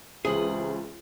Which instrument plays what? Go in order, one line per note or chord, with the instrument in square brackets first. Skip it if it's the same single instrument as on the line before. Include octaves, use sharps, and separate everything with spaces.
[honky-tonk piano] C#2 E3 F#7 [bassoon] C3 [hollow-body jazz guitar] G#4